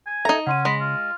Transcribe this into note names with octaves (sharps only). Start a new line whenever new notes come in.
G#5
D#4 A4 E5 A#5
C#3 C#4 F#5 C6 D#7
G#3 B5 C6 A#6
F4